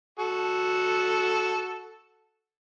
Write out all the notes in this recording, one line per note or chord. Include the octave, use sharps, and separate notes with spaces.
F#4 A4